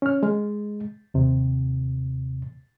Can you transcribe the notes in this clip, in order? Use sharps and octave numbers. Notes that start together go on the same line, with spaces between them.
C#4 F6
G#3
D#2 C3